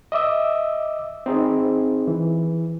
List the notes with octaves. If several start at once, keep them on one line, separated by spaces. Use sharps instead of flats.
D#5 E5 D6 E6
C4 D#4 G#4
E3